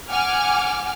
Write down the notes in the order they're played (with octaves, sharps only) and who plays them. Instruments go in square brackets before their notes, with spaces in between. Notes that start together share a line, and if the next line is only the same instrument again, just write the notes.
[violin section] F#5 G#5 D6 F6